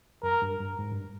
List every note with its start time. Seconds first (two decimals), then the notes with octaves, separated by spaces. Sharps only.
0.23 F#2 A#4
0.42 G2
0.61 G2
0.79 G#2
0.92 G2